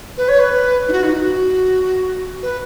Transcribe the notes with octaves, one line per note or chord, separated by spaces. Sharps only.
B4
C#5
B4
D#4
F#4
D#4
F#4
B4